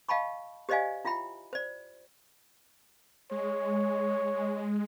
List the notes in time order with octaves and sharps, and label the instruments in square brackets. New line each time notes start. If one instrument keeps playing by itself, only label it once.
[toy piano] D#5 F5 G5 A5 B5 C#6
G4 C5 D5 D#5 F5 G#5
E4 F4 E5 G5 B5
C5 D5
[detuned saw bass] G#3 [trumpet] C#5